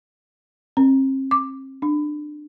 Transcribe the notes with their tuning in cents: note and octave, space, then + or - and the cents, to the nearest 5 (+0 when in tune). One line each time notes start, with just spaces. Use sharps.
C4 +40
D6 +10
D4 +25